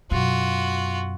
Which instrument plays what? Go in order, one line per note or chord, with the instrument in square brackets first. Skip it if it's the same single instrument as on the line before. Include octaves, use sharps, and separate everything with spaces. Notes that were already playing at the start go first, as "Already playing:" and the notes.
[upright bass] F#2 B2 [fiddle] F4 F#4